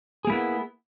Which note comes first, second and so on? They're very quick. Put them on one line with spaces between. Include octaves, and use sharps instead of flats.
G#4 A#3 E4 B3